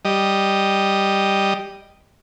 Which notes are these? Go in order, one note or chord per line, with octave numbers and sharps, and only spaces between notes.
G3 D#5